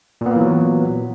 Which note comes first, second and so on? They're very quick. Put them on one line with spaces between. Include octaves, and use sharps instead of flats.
A#2 B3 A#3 E3 F#3